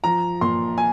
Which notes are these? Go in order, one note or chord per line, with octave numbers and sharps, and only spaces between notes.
F3 A#5
A#2 C6
G#5